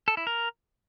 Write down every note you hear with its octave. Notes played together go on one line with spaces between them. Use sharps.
A4
E4
A#4